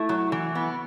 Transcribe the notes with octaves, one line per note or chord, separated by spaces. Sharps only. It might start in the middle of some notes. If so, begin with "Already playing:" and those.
Already playing: A3 E4
F#3
E3
B3